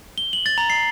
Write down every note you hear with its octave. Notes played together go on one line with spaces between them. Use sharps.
G7
F#7
A6
A#5
C7